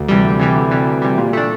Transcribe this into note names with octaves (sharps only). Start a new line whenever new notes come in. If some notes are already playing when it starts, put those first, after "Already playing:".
Already playing: D2
C3 E3 G3
D2
C3 E3 G3
D2
C3 E3 G3
D2
C3 E3 G3
A#2
A3 D4